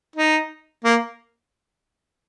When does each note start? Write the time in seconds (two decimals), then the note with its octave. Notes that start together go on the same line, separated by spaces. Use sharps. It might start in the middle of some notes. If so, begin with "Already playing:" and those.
0.16 D#4
0.84 A#3